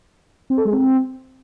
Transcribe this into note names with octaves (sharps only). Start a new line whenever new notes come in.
C4
A4
G#3
C4